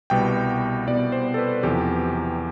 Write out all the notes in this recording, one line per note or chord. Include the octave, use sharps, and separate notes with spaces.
C2 B2 G3 B3 G5
C2 B2 G3 B3 D5
C5
A4
B4
E2 C3 F3 G4